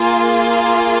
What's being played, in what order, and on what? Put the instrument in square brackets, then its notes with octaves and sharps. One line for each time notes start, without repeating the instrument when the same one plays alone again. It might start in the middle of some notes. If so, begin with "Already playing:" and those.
Already playing: [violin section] A#3 F4 G#4